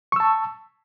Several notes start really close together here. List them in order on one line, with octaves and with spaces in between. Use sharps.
C#6 E6 A5